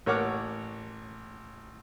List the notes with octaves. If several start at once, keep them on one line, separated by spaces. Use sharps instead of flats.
A1 A#3 C#5 F#5 D6 F6